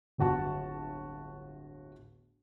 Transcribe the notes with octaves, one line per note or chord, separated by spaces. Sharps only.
D1 G1 F#4 A5 C#6